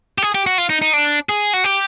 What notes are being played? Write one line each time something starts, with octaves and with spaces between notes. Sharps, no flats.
G4
G#4
G4
F#4
F4
D#4
D#4
D4
G#4
F#4
G4